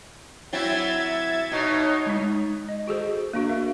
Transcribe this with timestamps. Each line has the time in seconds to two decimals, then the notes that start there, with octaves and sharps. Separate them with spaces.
0.53 F#3 C4 E4 E5 G#6 A6
1.52 B2 D#4 C#5
2.07 G#3 D#4
2.69 D#5
2.87 F#4 G#4 A4 C5
3.33 A#3 D4 F#4
3.49 A#4 E5 F5